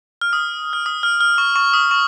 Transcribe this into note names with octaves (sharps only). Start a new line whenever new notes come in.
F6
D#6
F6
D#6
F6
F6
C#6
C#6
D#6
C#6